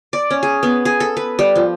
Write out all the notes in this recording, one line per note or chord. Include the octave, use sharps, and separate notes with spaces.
D5
C#4
G#4
B3
G#4
A4
B4
G3
F3